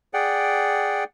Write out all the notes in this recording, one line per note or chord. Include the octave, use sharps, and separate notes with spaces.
G#4 D5 F#5 G5